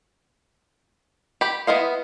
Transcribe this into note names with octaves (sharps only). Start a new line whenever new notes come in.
G4 B5
B3 E4 D#5 F5